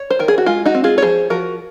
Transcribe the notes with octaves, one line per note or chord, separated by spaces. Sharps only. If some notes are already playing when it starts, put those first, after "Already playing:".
Already playing: C#5
C5
D#3 A#4
G#4
F#4
G#3 F4
D#4 F#4
C4
F4 G#4
C#5
F3 G#4 C5
F3 F#4 A#4